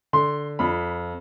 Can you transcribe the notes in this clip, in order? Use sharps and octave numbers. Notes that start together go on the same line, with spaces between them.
D3 C6
F2 B5